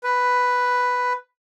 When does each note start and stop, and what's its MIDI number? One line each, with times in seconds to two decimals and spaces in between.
0.04 1.13 71